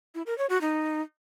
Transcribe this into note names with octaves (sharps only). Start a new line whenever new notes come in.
E4
A#4
C#5
F#4
D#4